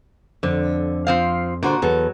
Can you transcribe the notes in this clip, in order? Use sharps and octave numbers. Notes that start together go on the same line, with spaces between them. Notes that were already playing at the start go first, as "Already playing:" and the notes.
F2 D3
F3 C4 F5
A#2 D3 F#4 C5
E2 F#3 A4